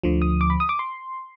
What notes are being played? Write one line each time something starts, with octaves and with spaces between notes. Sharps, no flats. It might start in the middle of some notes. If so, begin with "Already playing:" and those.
D2 D3 F3
D#6
D6
B5
D#6
D6
C6